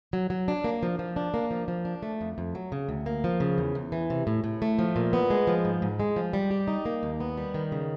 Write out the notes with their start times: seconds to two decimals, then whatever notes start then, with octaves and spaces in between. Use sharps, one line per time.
0.13 F#3
0.30 F#3
0.48 D4
0.64 A#3
0.83 F3
0.99 F3
1.16 D4
1.34 A#3
1.51 F3
1.68 F3
1.85 D4
2.03 A3
2.21 F2
2.38 F2
2.55 F#3
2.72 C#3
2.89 D2
3.06 A#3
3.24 F3
3.40 C#3
3.58 E2
3.75 E2
3.92 E3
4.10 C3
4.27 A2
4.44 A2
4.62 A3
4.79 F3
4.96 A#2
5.13 B3
5.30 G#3
5.47 F3
5.65 G#2
5.82 G#2
6.00 G#3
6.16 F3
6.33 G3
6.51 G4
6.68 D#4
6.85 A#3
7.03 D#2
7.20 B3
7.37 G3
7.54 D#3
7.72 C#3